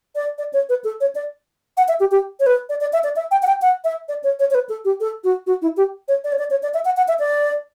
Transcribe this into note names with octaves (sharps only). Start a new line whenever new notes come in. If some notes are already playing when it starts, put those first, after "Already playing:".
D5
D5
C#5
B4
A4
C#5
D5
F#5
E5
G4
G4
C#5
B4
D5
D5
E5
D5
E5
G5
F#5
G5
F#5
E5
D5
C#5
C#5
C#5
B4
A4
G4
A4
F#4
F#4
E4
G4
C#5
D5
C#5
D5
C#5
D5
E5
F#5
F#5
E5
D5